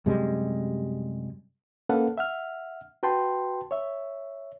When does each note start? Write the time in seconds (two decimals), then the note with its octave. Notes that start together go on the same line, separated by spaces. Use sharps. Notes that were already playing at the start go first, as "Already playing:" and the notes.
0.06 F#2 C3 G3 G#3
1.89 A#3 C#4 A4 B4 F5 F#5
2.18 E5 F#5 F6
3.03 F#4 B4 G5 A5 C6
3.71 C#5 E5